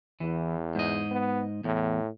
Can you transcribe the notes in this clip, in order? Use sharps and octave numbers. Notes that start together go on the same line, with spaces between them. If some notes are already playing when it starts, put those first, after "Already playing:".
E2 E3
G#2 D#5
B3
E2 A2